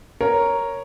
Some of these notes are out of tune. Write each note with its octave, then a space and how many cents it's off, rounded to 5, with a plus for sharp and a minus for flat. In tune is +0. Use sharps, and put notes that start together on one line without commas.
A#4 +0 C#5 +0